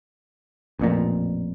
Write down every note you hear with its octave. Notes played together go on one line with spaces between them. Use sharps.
A1 F2 A#2